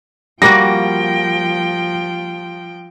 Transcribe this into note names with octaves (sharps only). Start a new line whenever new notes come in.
F3 G3 A#3 F#4 G5 A#6